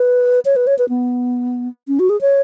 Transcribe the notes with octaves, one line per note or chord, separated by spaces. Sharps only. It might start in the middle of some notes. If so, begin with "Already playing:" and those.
Already playing: B4
C#5
B4
C#5
B4
B3
C#4
F#4
G#4
C#5